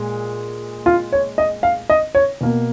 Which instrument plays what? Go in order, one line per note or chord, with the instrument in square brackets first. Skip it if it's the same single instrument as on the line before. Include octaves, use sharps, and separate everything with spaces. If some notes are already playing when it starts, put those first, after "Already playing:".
Already playing: [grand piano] A#2 G#3
F4
C#5
D#5
F5
D#5
C#5
B2 A#3